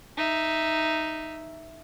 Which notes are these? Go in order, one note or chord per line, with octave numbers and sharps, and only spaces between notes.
D#4 E5